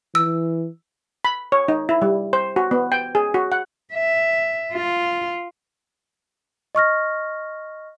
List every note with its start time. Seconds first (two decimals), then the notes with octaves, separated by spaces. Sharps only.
0.15 E3 E6
1.25 B5
1.52 C#5
1.68 D#4
1.89 E4
2.02 G3
2.33 C5
2.56 F#4
2.71 B3
2.92 G5
3.15 G#4
3.34 F#4
3.52 F#5
3.93 E5
4.73 F4
6.75 D#5 C#6 F6 A#6